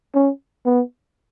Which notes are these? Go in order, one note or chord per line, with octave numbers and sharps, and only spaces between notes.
C#4
B3